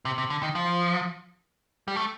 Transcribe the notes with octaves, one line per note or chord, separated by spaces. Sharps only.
C3
C3
D3
D#3
F3
G3
A3